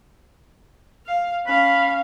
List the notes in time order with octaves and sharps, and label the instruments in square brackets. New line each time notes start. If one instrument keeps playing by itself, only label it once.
[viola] F5
[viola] C#4 F5 [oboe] B5